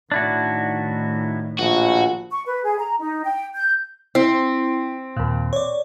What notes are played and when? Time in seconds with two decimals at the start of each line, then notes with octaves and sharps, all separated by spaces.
0.12 A2 D#3 D4 E4 F#4
1.59 A#1 F#4
2.31 C#6
2.46 B4
2.64 G#4
2.78 A#5
3.00 D#4
3.24 G5
3.55 G6
4.15 C4 E4
5.16 D#2 A#2
5.53 C#5 D5